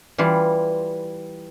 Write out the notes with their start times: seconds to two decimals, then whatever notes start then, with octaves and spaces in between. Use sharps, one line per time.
0.18 E3 G3 F4